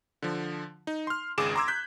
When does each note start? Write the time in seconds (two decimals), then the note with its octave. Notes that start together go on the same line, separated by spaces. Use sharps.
0.22 D3 F3
0.87 D#4
1.07 C6 F6
1.38 G#1 C#2 G#4 D6 E7
1.56 A#5 C6 D6 E6 G#6
1.68 F#6 G6 B6